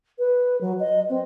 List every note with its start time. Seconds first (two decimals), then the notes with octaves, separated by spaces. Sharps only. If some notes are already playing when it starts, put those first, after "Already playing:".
0.19 B4
0.60 F#3
0.79 D#5
1.09 C4